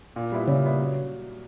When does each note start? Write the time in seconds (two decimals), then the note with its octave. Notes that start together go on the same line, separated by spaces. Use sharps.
0.16 A#2
0.32 G3 B3 E4
0.48 A#2 C#3
0.63 G3 B3 E4
0.78 F#3